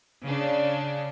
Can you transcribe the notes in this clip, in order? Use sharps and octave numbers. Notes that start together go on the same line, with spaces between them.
C#3 D4